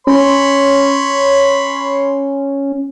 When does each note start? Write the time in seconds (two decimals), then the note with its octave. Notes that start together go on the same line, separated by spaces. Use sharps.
0.07 C#4 C#5 B5 C6